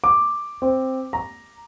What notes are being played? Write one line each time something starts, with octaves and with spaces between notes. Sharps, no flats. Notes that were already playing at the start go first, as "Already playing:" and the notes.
D6
C4
A#5